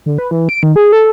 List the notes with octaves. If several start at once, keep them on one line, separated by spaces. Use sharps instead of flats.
D3
B4
E3
D7
D#3
G#4
A4